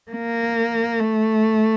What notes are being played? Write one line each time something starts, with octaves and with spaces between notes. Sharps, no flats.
A#3
A3